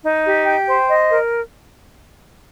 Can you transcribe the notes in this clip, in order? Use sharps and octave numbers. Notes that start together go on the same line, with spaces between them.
D#4
G4
G5
C5
D#5
A#4